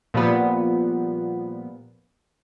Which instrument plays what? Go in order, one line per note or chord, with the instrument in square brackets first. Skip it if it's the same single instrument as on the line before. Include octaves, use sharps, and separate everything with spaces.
[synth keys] A#2 F3 G3 B3